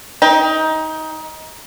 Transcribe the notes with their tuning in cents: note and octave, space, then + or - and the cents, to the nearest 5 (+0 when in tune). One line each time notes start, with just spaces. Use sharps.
D#4 +20 G5 +10